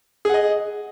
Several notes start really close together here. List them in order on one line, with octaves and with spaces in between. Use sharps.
G#4 F#5 D#5